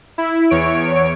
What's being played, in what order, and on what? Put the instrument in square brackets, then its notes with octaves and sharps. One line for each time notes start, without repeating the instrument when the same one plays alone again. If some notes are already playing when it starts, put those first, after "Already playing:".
[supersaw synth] E4
E2 C#5 D7